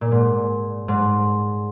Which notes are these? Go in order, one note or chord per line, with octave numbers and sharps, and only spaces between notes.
A#2
G#2
G#2